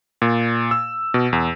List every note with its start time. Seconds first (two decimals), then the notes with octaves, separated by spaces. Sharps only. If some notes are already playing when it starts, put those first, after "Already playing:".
0.22 A#2
0.71 E6
1.14 B2
1.33 E2